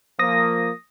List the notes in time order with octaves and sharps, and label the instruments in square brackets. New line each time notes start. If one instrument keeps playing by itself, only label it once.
[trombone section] F3 A#3 [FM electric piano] D#6 A#6